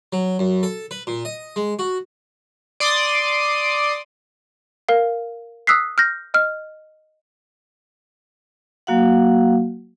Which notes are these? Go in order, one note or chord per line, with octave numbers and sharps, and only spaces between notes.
F#3
F#2
A4
B4
A#2
D#5
G#3
F#4
D5 C6 D6 D#6
A#4 F5
D#6 E6 F#6 B6 C7
F6 G6 A#6
D#5 F6
F#3 A#3 F#4 F5 F#5